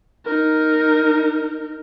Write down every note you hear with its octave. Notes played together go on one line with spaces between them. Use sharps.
D#4 A#4